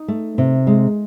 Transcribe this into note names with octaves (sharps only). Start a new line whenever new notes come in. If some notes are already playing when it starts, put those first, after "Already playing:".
Already playing: D#4
A3
C3
G#3